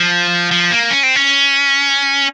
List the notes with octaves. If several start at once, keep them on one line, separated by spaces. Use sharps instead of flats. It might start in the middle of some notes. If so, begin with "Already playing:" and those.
Already playing: F3
F3
A#3
C#4
C4
C#4